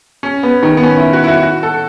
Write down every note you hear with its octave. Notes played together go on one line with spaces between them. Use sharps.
C#4
B3
D#3
B3
C#4
E4
F#4
E4
F#4
F#4
A4